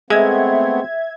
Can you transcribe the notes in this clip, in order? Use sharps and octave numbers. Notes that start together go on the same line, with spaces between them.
G#3 A3 B3 C4 E5 G#6